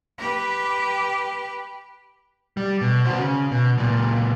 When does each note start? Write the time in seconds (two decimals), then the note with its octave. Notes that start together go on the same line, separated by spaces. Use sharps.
0.18 G4 B4
2.57 G3
2.81 B2
3.05 F#4 C5
3.19 C#3
3.51 B2
3.77 C#2 A#2